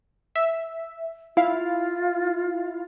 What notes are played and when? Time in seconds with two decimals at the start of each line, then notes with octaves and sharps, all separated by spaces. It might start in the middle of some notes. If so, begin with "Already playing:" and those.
0.35 E5
1.37 E4 F4 F5